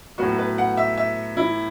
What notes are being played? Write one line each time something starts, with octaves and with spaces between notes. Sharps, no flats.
A2 F#3 B3 F#4
B4
F#5
E5
E5
E4